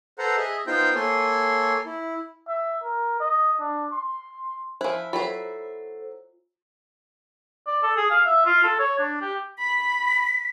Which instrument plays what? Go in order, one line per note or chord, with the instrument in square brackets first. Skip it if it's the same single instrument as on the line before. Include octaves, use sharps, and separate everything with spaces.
[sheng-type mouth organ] A4 B4 C5 F#5 A#5
G#4 D#5 E5
B3 D#4 F4 C5 G5 G6
A#3 A4 C#5 G#5 C6
E4
[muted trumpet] E5
A#4
D#5
D4
C6
[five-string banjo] F3 E4 [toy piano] C5 G#5
[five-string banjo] F#3 E4 B5 [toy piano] F4 [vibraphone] A4 C5
[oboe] D5
A4
G#4
F5
E5
F4
A4
C#5
D4
G4
[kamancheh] B5 [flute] B6